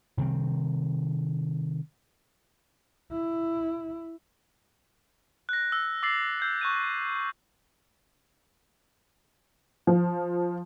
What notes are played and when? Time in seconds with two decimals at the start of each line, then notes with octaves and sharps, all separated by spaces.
0.17 C3 D#3 G3 C4
3.11 E4
5.49 F#6 A#6
5.72 E6
6.03 D6 E6 A6 C7 F#7
6.40 E6 G6 C7
6.61 C#6 F#6 D#7
9.87 F3